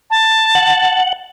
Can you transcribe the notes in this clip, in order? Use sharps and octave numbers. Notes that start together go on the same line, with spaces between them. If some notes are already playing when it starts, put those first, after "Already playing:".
A5
F#5